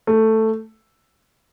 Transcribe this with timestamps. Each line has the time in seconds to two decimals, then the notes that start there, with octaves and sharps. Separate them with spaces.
0.07 A3